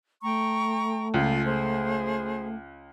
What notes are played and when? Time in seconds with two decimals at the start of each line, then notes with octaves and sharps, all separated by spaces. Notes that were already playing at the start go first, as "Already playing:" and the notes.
0.23 A3 G5 A#5 C#6
1.14 C#2 F4
1.46 G#4 C5